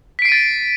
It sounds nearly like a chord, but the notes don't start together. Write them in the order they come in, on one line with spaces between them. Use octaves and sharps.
B6 D7 C7 D#7 A6